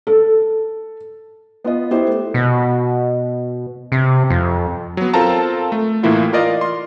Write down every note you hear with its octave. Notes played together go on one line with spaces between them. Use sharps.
A4
B3 F4 D#5
B3 E4 G4 C5
A3
B2
C3
F2
F#3 B3
C4 F4 A4 A#4 A5 A#5
A3
A2 E3 A#3 E4 F4
F4 A#4 D5 D#5 F5
C6